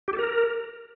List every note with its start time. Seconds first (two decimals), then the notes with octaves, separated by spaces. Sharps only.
0.08 G4
0.13 A4
0.18 A#4